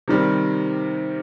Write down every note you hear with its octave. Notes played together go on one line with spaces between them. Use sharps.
C3 D#3 G3 C4